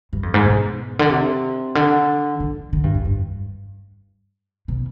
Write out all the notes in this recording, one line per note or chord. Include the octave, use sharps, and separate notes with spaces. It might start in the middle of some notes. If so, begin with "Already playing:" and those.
G2
F2
G#2
B2
D3
C3
D3
D3
D3
G2
F2
G2
B2